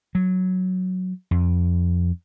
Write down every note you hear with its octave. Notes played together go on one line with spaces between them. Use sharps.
F#3
F2